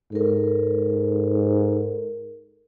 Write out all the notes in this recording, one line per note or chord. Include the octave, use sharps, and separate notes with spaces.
G#2 A4 A#4